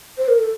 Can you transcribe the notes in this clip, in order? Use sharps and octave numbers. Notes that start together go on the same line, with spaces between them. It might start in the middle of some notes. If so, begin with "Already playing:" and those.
C5
A#4
A4